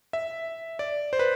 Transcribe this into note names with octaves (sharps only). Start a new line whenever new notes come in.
E5
D5
C5
B4